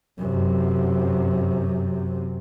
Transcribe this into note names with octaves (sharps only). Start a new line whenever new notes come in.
F#2 C3